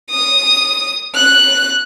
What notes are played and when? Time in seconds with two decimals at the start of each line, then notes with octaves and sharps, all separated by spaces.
0.11 D#6
1.15 F#6